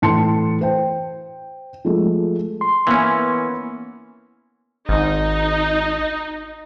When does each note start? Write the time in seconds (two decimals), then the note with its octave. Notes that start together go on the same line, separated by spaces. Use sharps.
0.02 A2 E3 A5 C6 C#7
0.61 C5 G5
1.85 F3 G#3 A3
2.61 C6
2.87 E3 A#3 B3 C#4
4.89 G#1 D#4